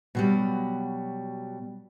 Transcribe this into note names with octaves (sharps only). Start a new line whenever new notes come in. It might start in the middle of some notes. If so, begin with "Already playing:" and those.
B2 F#3 G3